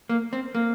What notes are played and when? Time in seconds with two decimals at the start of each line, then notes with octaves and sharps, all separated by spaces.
0.09 A#3
0.33 C4
0.55 A#3